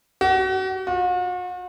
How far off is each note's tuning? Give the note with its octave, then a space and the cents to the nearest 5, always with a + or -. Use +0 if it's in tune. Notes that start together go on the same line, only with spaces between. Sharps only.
F#4 +35
F#4 -45